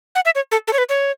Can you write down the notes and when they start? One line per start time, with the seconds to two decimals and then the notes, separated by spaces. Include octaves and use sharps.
0.15 F#5
0.25 E5
0.35 C#5
0.52 A4
0.68 A4
0.73 C#5
0.78 B4
0.89 C#5